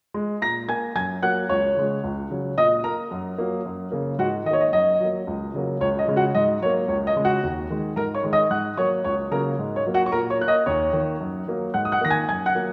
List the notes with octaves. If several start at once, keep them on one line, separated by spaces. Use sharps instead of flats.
G#3
A#2 A#5 A#6
A#3 G#5 G#6
F#2 G#5 G#6
F#3 A#3 F#5 F#6
C#2 C#5 C#6
C#3 G#3
C#2
C#3 F#3
A#2 D#5 D#6
A#3 A#4 A#5
F#2
F#3 A#3
F#2
C#3 A#3
G#2 F#4 F#5
D#3 D#5
A#3 C#5
D#5
F#2 D#5
F#3 A#3
C#2
C#3 F#3 A#3
C#2 C#5
D#5
C#3 G#3
F#4 F#5
G#2 D#5
F#3 A#3 C#5
C#2 C#5
D#5
C#3 G#3
F#4 F#5
D#2
D#3 G#3
G#2 A#4 A#5
C#5 C#6
D#3 G#3
D#5 D#6
G#2 F#5 F#6
F#3 A#3 C#5 C#6
C#2 C#5 C#6
C#3 F#3 A#3 A#4 A#5
G#2
C#5
F#3 A#3
F#4 F#5
C#6
A#2 A#4 A#5
C#5 C#6
A#3 F#6
D#5 D#6
D#2 C#5 C#6
D#3 A#3
F#2
F#3 A#3
G#2 F#5 F#6
D#6
F#5 F#6
D#3 A#3 A#6
G#5 G#6
F#2 G#5 G#6
F#5 F#6
F#3 A#3